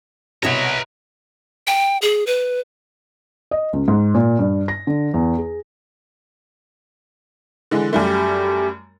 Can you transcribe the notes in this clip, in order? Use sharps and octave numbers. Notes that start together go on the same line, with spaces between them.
C2 B2 B4 C#5 D#5 E5 A#5
G5
G#4
B4
D#5
C#2
G#2
A#2
G2
A#6
D3
E2
G#4
D3 E3 G#3
F#2 G3 A3 G4